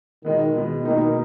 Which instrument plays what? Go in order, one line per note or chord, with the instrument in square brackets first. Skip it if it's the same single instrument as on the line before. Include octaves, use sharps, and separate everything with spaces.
[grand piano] B2 G#3 B3 [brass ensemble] D#3
[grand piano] B2 G#3 B3
[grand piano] B2 A#3 D#4 [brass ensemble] D#3